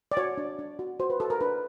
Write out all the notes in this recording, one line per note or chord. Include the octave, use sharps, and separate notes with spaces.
D5
F#4 C#5
D4
D4
F#4
F#4 C5
B4
F#4 A4
A#4
D4 B4